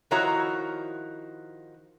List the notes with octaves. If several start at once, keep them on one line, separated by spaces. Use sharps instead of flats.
D#3 F3 E4 F#4 C#5 A#5